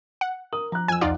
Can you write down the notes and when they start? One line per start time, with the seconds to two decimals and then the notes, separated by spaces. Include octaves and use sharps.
0.21 F#5
0.53 A#4 D#6
0.72 F3 A#5 F#6
0.88 F2 G#5 E6
1.01 B1 E2 D#4 F4 D5 F#5